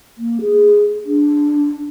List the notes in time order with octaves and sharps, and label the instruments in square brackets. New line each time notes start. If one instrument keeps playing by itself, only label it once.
[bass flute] A#3
G#4
D4